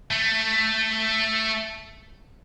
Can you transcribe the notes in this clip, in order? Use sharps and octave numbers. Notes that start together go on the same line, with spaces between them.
A3